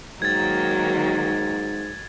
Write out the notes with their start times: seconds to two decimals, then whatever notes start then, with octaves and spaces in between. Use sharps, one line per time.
0.22 G#2 D#3 F#3 A#3 G#6 A6